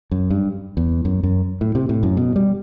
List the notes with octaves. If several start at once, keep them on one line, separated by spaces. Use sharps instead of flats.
F#2
G2
E2
F#2
F#2
A2
C3
A2
F#2
B2
G3